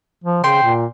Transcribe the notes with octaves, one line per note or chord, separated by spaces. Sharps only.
F3
C#3 G5 C6
A#2